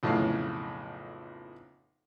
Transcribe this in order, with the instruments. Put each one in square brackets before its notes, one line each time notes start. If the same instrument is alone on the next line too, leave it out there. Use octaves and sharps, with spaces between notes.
[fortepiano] B1 F2 A2 C#3 F5